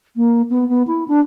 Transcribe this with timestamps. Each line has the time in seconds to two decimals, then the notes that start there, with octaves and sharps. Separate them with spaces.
0.17 A#3
0.50 B3
0.69 B3
0.87 E4
1.08 D4